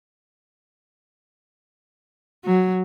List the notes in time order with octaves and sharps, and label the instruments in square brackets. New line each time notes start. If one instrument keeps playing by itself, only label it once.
[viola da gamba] F#3